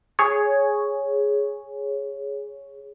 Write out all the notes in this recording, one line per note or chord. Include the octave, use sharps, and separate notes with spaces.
G#4 C#5